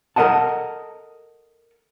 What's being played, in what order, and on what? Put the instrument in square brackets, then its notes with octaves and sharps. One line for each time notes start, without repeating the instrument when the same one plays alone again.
[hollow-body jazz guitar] A4 A#4 D5 D#5 F#5 A5